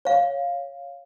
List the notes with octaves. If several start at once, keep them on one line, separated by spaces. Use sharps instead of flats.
C#5 F5